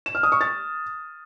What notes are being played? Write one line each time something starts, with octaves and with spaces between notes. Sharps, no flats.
E7
F6
D#6
C#6
A6